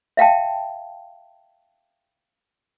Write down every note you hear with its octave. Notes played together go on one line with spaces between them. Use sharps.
E5 F5 G5 A5